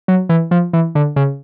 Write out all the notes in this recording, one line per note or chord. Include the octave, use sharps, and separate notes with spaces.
F#3
E3
F3
E3
D3
C#3